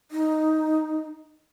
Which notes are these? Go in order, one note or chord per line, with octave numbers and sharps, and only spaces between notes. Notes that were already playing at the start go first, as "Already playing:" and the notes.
D#4